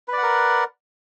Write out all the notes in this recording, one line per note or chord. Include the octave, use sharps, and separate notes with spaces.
A#4 B4 D5 F#5